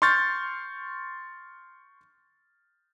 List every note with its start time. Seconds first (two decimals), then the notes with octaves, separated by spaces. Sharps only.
0.02 C6 C#6 F6 G6 A6